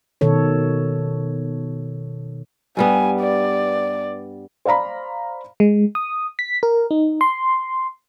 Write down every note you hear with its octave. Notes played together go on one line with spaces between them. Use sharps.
B2 D#3 A4 C#5
G2 G3 B3 G#5
D5
C5 D5 F5 A#5 B5
G#3
D#6
B6
A#4
D#4
C6